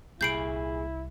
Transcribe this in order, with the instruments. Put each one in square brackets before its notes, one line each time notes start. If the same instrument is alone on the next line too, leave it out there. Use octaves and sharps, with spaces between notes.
[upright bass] C2 [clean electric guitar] A#2 G#4 B5 [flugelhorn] E4 [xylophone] G6 C7 D7